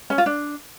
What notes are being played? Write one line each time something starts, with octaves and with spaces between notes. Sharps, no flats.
C#4
F4
D4